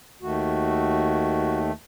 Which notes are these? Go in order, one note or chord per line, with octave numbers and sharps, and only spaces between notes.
D#2 D#3 A3 F#4